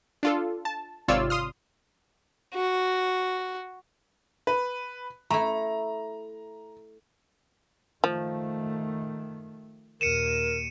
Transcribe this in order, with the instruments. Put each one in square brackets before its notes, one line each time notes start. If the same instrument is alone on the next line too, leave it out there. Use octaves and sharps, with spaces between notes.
[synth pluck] D4 F4 A4
A5
G#1 C3 F4 C#5 D5 E6
C6 D#6 F6
[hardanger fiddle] F#4
[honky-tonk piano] B4
[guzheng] A3 E4 [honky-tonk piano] A#5
[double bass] D#3 A3 [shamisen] F3
[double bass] D#2 A#2 [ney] A#4 [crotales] C#7 D#7 E7